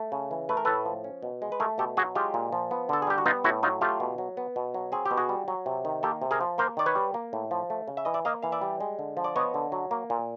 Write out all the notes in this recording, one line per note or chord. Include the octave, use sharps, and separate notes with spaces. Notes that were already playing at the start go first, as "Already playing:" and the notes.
Already playing: A3
C#3
E3
A3 B4
A#4
A2 A4 B4
F3
C#4
B2
G#3
B4
A3 G#4 A#4
B2 G4 A4
F#3 F#4 G#4
G#3 F4 G4
A#2
F3
B3
D3 A4
G#4
G3 G4
F#4
B3 D#4 F4
A2 E4 F#4
F#3 D#4 F4
A3 F4 G4
B2
F#3
B3
B2
F#3
C4 G#4
G4
B2
F#4 G#4
G3
F#3
C3
D#3
A#3 G4 A4
C3
G#4 A#4
F3
A#3 A#4 C5
D#3 D5
B4 C#5
G3
A#3
A2
F3
A3
C#3
E5
E3 D#5
D5 E5
A#3 D#5 F5
E3 F5
D5 E5
G3
G#3
D3
F3
D5
B3 C#5 D#5
D3
F#3
A#3
A#2